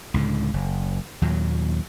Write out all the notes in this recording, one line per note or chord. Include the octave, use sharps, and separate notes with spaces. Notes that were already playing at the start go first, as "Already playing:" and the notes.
C#2 A2 D3
F#1
D#2 A#2 F#3